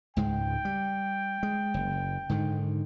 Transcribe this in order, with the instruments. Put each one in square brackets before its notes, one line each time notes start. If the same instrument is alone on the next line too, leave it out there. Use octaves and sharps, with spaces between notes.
[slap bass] C#2 G#2 G#3 [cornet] G5
[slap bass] G3
G#3
F#1
G#2 D3 D#3